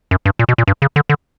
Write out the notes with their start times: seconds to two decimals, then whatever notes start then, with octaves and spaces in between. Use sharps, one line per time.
0.11 F#2
0.26 G2
0.39 A#2
0.49 B2
0.58 A#2
0.68 G2
0.82 C#3
0.96 D3
1.10 D3